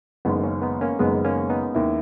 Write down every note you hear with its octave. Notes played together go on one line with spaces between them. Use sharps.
F#1 F#2 D#3 G#3 B3
A#3 C#4
B3 D#4
A#3 C#4
F#1 F#2 D#3 G#3 B3
A#3 C#4
B3 D#4
D#2 D#3 A#3 E4